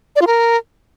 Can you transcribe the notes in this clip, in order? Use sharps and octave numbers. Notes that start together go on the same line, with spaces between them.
D5
F4
A#4